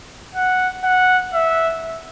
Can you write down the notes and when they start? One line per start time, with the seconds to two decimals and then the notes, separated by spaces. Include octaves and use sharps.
0.35 F#5
0.84 F#5
1.34 E5